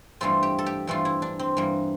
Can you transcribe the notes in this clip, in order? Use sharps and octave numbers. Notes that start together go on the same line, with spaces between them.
G2 E3 A3 C4 F4
G4
A4
G4
G2 E3 A3 C4 F4
E4
D4
C4
G2 E3 A#3